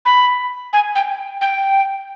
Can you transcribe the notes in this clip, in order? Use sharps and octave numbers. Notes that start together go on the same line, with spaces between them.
B5
G#5
G5
G5